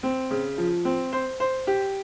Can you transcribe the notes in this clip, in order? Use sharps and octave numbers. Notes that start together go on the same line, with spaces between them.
C4
C#3
F3
C4
C5
C5
G4